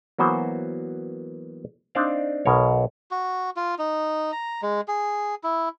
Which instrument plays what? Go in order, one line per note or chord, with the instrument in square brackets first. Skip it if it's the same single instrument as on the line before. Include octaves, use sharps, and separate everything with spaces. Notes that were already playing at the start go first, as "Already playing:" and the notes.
[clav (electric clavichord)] E3 F#3 A#3 B3 F#4 C5
C4 D4 D#4 C5 D5 F5
B1 B2 A#4 C#5
[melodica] F#4
F4
D#4
A#5
G#3
G#4
E4